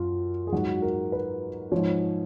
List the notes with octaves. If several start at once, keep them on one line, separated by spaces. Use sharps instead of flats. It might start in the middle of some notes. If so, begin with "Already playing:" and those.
Already playing: F#2 F4
G#4
G#2 F#3 F#4
A#4
B4
G#2 F3 C#5